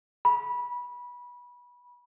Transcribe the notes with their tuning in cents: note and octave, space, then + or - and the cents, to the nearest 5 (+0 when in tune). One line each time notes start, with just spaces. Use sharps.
B5 -20